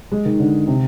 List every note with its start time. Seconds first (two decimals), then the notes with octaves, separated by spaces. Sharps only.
0.12 G#3
0.25 D#3
0.40 D3
0.67 C3